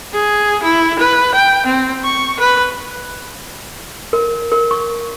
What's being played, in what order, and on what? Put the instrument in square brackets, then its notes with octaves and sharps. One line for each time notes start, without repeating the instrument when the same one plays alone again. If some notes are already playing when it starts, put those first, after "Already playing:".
[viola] G#4
E4
B4
G5
C4
C#6
B4
[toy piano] A#4
A#4
C#6